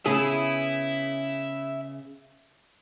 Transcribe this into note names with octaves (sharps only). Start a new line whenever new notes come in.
C#3 B3 G#4 E5 B5